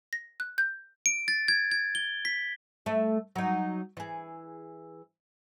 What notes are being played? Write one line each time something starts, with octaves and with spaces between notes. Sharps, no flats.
A#6
F#6
G6
D7
A6
G#6
G#6
G7
B6
A3 E5
F#3 D#4
E3 G#4